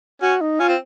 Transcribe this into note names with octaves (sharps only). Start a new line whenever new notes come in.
C#4 F#4
D#4
C#4 F4
C4